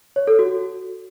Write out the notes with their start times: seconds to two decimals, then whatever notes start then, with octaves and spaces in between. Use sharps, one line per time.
0.16 C#5
0.27 A4
0.39 F#4